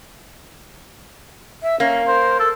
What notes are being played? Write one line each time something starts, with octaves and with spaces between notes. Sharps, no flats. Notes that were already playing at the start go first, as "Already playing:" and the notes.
E5
A#3 C#4
A#4 C5
A4